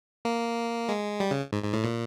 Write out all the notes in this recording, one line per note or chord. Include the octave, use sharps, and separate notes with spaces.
A#3
G#3
G3
C#3
G#2
G#2
A2
A#2